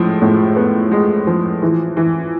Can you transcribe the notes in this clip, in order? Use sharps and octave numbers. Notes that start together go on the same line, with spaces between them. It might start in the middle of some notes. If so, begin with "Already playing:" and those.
Already playing: A2 F3 G#3
A2
B3
G#3
F3
E3
E3